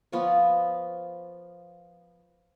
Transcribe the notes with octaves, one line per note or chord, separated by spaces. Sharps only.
F3 B3 F4 C#5